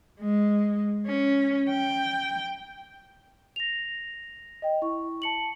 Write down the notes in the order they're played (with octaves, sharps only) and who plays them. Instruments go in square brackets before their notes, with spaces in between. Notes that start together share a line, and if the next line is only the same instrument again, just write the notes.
[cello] G#3
C#4
G5
[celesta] A#6 F7
D#5 G5
E4 C#6
A5 C#7 F#7